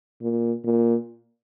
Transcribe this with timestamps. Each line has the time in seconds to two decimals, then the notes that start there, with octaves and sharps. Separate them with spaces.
0.22 A#2
0.65 A#2